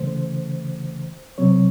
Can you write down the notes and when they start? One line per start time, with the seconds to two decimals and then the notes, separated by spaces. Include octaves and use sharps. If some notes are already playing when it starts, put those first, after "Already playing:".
Already playing: C#3 E3 A3 C5
1.38 C3 F#3 C4 C#5